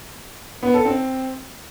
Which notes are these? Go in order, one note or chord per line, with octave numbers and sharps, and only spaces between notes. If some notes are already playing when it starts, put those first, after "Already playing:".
B3
A4
C4